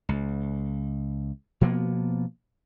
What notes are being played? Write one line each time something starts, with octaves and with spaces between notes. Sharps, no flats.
C#2
B2 F3 A#3 B3